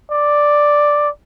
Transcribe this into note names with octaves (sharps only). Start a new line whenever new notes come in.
D5